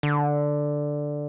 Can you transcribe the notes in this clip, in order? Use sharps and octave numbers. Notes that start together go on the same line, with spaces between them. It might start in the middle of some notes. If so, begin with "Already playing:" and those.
D3